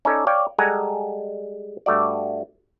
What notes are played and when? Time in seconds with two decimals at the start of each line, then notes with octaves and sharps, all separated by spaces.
0.05 C#4 D#4 A4 D5
0.27 C#5 D5 F5 G5
0.58 G3 G#3 A4 F#5 G#5 A#5
1.86 G2 A3 F#4 D5